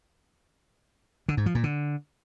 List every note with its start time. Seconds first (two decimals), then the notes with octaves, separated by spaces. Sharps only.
1.28 D3
1.37 G#2
1.46 F3
1.55 A#2
1.64 D3